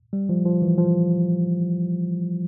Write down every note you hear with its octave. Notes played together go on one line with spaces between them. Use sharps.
G3
F3
F3
E3
F3